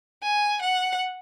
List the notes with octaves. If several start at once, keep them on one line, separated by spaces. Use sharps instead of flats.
G#5
F#5